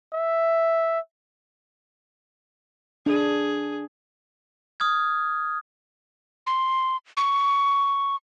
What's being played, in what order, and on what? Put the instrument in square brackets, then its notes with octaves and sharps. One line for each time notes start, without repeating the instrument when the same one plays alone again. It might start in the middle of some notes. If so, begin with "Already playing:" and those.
[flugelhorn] E5
[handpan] D4 [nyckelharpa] G#4
[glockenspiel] D#6 F6 G#6
[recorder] C6
C#6